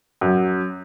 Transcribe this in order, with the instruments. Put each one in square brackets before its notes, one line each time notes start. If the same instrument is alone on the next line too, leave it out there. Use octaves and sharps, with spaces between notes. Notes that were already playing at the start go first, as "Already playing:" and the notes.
[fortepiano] F#2